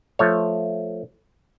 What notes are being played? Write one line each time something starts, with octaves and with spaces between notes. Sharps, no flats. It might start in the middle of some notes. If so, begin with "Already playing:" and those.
F3 A3 C#5